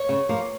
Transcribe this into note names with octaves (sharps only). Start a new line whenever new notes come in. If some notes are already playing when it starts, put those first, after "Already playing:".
Already playing: C#5
C#3
F3 A#3